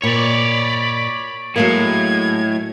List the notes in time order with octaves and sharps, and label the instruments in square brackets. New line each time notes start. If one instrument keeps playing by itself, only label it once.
[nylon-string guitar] A#2 [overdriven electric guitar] C#5 D5 [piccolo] B5
[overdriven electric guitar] A2 [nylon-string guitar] F#3 G#3 A#3 [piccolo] G#6